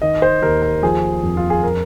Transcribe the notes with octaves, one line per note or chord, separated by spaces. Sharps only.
D#3 D#5
C5
D#2 A#4
A#4
F3 G#4
F2
F4
G#4
A#4